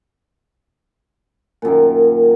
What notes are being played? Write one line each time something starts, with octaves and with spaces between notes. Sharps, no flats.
F#2 A#2 D#3